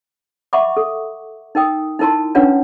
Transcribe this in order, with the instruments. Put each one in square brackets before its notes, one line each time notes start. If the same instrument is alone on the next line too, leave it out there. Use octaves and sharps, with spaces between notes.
[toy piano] E5 F#5 B5 C#6 D6
A4
D#4 A#4 G5 D#6
D#4 E4 A#4 A5 C6
C#4 D4 F4 B4 C#5 F#5